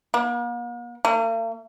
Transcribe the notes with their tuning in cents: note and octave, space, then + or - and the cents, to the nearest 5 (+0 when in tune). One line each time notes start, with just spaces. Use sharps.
A#3 +45
A#3 -45